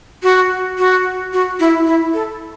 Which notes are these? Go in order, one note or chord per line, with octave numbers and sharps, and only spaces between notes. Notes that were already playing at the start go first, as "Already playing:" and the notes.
F#4
F#4
F#4
E4
E4
A4